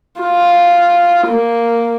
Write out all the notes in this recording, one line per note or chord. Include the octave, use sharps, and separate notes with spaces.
F4
A#3